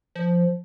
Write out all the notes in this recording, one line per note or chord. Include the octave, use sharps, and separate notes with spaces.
F3